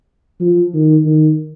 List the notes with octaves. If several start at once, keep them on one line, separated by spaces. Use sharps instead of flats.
F3
D#3
D#3